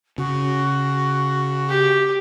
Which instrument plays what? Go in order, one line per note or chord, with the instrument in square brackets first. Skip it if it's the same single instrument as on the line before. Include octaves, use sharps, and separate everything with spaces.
[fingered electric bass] C#3 [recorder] F#4
[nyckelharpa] G4